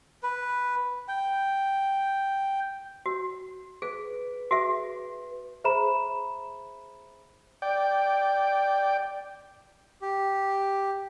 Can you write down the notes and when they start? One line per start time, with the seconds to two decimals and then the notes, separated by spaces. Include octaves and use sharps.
0.23 B4
1.08 G5
3.06 F#4
3.82 G#4 B4
4.51 F#4 G#4 E5
5.64 G#4 C5 E5 A#5 B5 E7
7.62 D5 G5
10.02 G4